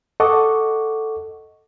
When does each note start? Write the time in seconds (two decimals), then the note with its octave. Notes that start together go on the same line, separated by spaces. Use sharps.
0.20 A4 D#5 F#5 C#6 D6